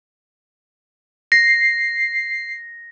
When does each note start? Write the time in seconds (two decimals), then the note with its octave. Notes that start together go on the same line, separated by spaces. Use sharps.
1.32 A#6 C7